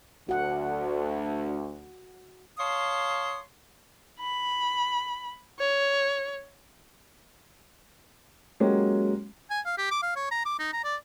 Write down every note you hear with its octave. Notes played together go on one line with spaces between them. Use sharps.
D2 F#4 F#5
C#5 F5 A5 C6 C#6 D#6
B5
C#5
F#3 G#3 A#3 C#4 F#4 G4
G#5
F5
G4
D6
F5
C#5
A#5
D6
D#4
A#5
D5